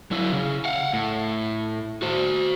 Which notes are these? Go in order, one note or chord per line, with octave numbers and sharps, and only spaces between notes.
F#3 E4
C#3
F5 F#5
A2
F#4 C5